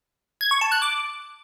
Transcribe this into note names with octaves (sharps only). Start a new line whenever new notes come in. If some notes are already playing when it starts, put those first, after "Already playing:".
G#6
C#6
A5
F#6
D6